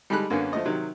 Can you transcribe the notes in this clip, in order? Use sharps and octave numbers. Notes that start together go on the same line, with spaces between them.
G3 G#3 D#4 A4 B5 F#6
F#2 D3 A#3 B3 C#4
F3 A3 D#5
C3 D#3 F#3